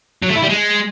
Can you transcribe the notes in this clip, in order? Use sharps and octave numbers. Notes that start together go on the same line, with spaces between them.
F#3
A3
E4
G3
G#3